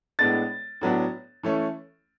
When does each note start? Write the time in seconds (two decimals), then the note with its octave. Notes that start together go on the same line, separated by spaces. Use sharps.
0.19 A2 G#3 B3 D4 A6
0.81 A2 F#3 B3 D4
1.43 E3 A3 C#4